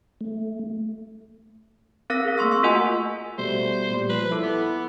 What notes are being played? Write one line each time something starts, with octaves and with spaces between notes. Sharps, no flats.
A3
C4 A#4 F5 E6 A#6
G#4 A#4
A3 A#3 C6 C#6 E6
C#6 E6
F4 F#4 A#4 D#5 F#5 G#5
B2 G3 A3 C5
A#2 G3
F3 B4
E4 A4 D6
B3